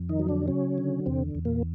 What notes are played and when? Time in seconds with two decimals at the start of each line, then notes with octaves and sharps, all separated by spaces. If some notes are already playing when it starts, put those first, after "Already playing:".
Already playing: F2
0.09 D#3 D#4
0.19 F#3
0.28 D3 D4
0.48 C#3 F#3 C#4
0.78 D3
1.06 E2 C3 C4
1.35 E2
1.45 A#2 A#3